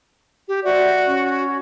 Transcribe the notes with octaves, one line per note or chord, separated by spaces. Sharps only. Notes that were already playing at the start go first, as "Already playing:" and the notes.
G4
F#4 C5 D5 E5
C#4